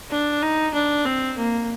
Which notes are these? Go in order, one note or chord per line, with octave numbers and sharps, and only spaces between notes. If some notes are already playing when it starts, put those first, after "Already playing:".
D4
D#4
D4
C4
A#3